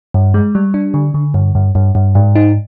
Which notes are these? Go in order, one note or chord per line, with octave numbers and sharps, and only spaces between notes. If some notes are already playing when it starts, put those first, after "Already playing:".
G2
G#3
G3
D4
D3
D3
G2
G2
G2
G2
G#2
D#4